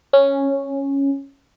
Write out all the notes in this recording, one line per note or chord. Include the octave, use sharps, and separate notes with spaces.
C#4